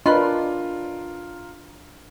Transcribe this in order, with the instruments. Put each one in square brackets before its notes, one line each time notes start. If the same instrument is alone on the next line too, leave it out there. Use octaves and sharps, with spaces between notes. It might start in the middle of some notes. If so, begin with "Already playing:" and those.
[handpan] D4 [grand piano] F4 A#4 [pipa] B4 B5 C6 [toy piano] D#5